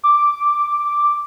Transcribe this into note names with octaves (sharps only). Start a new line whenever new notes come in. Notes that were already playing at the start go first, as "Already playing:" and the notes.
D6